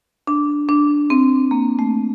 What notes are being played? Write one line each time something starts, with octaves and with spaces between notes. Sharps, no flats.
D4
D4
C4
A#3
A3